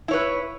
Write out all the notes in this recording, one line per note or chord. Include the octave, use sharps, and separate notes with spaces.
E4 B4 C#5